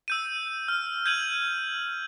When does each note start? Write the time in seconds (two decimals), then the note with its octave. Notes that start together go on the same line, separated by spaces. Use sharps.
0.08 E6 G6 D#7
0.68 F6
1.06 G6 G#6 D#7 F#7